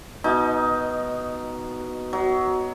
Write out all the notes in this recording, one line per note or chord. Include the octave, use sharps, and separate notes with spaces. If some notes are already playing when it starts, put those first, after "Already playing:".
B2 D#4
F#3